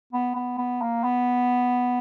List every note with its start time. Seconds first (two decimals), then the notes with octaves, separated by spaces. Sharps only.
0.13 B3
0.35 B3
0.58 B3
0.82 A#3
1.04 B3